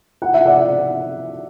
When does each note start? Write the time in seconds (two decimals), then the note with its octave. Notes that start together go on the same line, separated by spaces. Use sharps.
0.22 F#5
0.34 E5
0.45 D5 F#5